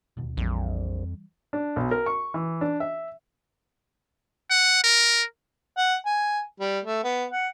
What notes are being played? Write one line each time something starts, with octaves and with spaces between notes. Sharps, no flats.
D1 D#2 B2
A#1 F2 E3 G3
D4
B1
A#4
C#6
E3
D4
E5
F#5
A#4
F#5
G#5
G3
A3
B3
F#5